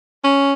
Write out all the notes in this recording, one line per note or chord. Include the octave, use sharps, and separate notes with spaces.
C#4